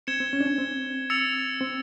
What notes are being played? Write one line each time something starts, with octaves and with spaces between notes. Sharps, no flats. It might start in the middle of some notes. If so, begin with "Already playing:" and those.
C4 G#6 C#7 E7 G7
C4
C#4
D4
C#4
C4
E6 A6 C#7 F7
C4